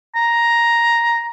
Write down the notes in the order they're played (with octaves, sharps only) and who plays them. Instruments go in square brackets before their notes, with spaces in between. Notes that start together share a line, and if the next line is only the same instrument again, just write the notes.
[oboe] A#5